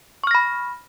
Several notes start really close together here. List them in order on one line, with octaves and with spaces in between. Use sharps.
C#6 F6 A#6 B5